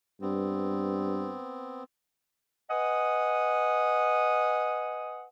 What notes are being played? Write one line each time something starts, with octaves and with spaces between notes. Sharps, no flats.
G2 B3 C4
B4 D#5 F#5 G#5 D#6